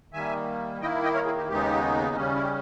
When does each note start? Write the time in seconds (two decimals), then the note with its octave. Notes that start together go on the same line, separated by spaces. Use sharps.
0.13 D#3 G3 A#3 E5 G#5
0.81 D#3 A#3 E4 D#5 G5
1.03 D#5 G5
1.14 A#4 C#5
1.25 E4 G#4
1.37 G4
1.48 D#2 C#3 G#3 B3 D#4 G4
2.16 C#3 G3 C#4
2.35 E4
2.42 G4